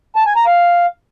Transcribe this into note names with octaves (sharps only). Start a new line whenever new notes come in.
A5
G#5
A#5
F5